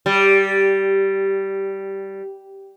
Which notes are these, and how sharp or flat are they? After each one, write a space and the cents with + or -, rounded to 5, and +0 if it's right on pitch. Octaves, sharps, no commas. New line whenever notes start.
G3 -10